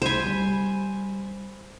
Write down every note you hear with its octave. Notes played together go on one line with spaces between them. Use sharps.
C2 C5 G#5 B5
G3 B5